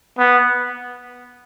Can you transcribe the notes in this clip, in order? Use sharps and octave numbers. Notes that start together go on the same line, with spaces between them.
B3